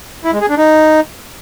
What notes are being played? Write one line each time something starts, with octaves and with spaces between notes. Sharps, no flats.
E4
G#3
G#4
D4
D#4